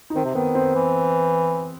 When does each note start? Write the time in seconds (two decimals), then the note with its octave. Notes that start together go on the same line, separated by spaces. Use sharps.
0.10 D#4
0.16 D#3 C4
0.25 C3
0.35 D#3 B3
0.55 C4
0.75 E3